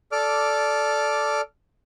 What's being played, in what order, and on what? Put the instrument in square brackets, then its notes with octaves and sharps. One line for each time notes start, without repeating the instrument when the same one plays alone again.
[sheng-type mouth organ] A4 D5 D6 F6